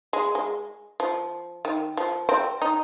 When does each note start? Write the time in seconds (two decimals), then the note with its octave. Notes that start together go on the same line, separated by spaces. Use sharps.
0.13 G#3
0.35 G#3
1.00 F3
1.65 D#3
1.97 F3
2.29 C4
2.62 D#4